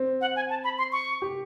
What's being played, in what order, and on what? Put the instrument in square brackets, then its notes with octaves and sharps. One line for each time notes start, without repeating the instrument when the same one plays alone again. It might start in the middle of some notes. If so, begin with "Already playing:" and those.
Already playing: [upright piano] C4
[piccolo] F#5
G#5
A5
B5
C6
C#6
[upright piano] G4